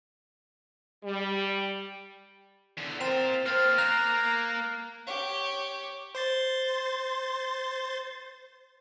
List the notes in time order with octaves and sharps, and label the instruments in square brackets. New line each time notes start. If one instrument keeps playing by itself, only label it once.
[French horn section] G3
[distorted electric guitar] E2 D3
[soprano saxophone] C4 [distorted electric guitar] F4 A#4 [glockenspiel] A6 E7
[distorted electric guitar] A#3 G4 [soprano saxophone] C5 [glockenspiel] F6 A6
[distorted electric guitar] A#3 [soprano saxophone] A#5 [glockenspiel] F#6 A#6 F7
[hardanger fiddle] G4 C#5
[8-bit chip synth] C5 C6 A6